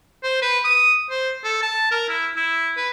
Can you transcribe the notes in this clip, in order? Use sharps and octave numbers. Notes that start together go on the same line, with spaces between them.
C5
B4
D#6
C5
A4
A5
A#4
E4
E4
B4